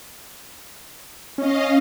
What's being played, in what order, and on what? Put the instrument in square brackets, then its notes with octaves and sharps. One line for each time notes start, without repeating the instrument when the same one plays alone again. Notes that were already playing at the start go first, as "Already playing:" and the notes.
[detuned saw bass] C#4 [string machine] D#5 F5